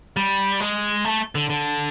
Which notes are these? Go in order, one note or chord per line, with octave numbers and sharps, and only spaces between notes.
G3
G#3
A3
D3
D3